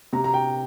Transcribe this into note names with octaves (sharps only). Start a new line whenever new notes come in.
C3 A#5
A#5
G5